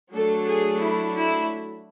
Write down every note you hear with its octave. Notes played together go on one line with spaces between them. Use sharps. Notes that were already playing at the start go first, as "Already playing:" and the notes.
F#3 A3 D4 A4
G#4
E4
E4